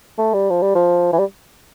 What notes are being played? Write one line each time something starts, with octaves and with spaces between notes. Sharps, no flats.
A3
G3
F3
G3
F3
E3
G3